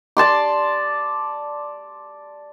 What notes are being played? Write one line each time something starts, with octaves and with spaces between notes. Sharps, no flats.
D5 A5 C6 D6